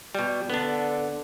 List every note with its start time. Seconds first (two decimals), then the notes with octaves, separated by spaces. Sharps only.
0.15 B2 G3
0.50 D3 B3 D4